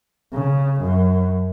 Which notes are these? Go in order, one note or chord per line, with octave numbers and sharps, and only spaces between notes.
C#3
F#2